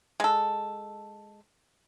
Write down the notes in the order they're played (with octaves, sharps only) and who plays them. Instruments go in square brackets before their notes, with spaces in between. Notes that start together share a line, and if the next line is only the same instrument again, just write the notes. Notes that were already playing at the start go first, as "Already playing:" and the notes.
[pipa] G#3 A4